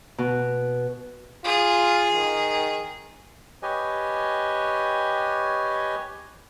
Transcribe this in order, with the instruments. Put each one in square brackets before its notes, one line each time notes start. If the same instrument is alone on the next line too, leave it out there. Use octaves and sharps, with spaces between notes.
[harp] B2
[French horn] F4 [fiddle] G#4
[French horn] D#3
[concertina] G4 B4 C#5 D#5 G#5